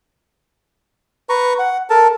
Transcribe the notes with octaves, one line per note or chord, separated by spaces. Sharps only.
B4 A#5 C#6
F#5
A4 A#4 A5